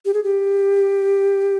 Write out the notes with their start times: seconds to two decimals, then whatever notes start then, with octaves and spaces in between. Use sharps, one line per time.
0.05 G4
0.14 G#4
0.24 G4